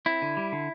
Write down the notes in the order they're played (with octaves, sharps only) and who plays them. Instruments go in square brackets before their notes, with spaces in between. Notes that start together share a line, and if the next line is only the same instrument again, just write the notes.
[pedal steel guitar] C4 E4
D3
G3
D3